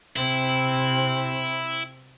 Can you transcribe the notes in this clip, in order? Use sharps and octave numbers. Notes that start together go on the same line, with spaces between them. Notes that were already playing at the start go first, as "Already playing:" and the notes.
C3 C4 E4